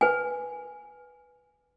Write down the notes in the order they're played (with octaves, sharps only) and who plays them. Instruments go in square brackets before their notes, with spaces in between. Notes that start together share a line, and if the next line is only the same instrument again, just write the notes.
[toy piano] B4 G#5